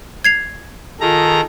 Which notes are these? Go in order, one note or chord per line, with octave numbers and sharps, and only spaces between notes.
G#6 C7 F7
D#3 F4 G#4 A4 A#5